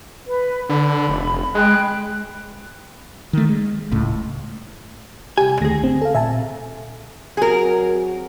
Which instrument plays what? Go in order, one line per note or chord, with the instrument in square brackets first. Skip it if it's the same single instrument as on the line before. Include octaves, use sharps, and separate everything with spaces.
[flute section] B4
[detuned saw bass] D3 [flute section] B5
[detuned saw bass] F1
[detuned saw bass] G#3 [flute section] G5 B5 F#6
[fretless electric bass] D#3 A3
G#3
D#1 C#2 A2
[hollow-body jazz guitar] C2 G#5 [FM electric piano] G4
[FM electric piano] D#2 A3 A#6 [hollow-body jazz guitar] D3 G#4
[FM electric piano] G#1 C4
A4 F5
[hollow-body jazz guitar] A#2 [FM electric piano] E5 G#5 A5
[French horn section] F#3 C4 F#4 [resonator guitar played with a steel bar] G#4 A#4